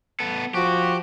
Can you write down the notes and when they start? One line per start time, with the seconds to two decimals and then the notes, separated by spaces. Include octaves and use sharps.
0.20 B3 A4
0.55 F3 F#4 G4